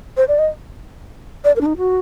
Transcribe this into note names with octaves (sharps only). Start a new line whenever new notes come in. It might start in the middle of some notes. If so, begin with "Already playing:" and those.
C5
D5
D#5
D5
A#4
D4
D#4
F#4